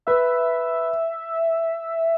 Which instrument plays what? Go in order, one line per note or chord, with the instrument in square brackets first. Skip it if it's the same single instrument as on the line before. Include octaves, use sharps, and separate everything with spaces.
[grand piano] B4 [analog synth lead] E5